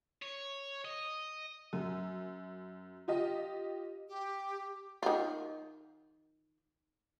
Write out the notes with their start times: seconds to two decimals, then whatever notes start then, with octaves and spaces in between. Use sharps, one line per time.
0.22 C#5
0.85 D#5
1.73 F#2
3.08 F4 G4 D#5
4.08 G4
5.03 D#3 F4